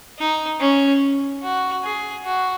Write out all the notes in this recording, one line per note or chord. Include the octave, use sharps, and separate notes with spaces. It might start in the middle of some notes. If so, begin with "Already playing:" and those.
D#4
C#4
F#4
G#4
F#4